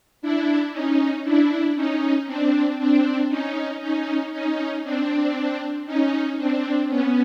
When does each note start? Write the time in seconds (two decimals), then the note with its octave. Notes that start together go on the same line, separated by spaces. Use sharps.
0.22 D4 E4
0.73 C#4 D#4
1.24 D4 E4
1.76 C#4 D#4
2.27 C4 D4
2.79 C4 D4
3.29 C#4 D#4
3.81 C#4 D#4
4.33 C#4 D#4
4.84 C4 D4
5.86 C#4 D#4
6.38 C4 D4
6.89 B3 C#4